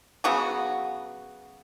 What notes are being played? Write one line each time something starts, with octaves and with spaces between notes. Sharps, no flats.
C#3 F#3 B3 F#4